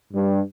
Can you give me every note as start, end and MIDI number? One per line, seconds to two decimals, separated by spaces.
0.13 0.40 43